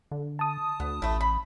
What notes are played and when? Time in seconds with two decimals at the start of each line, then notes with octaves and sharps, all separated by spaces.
0.11 D3
0.39 A5 D#6
0.80 D2 B3
1.02 A1 A3 E4
1.21 B5